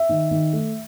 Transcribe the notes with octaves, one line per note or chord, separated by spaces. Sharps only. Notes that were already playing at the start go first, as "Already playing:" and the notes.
Already playing: E5
D#3
D#3
A3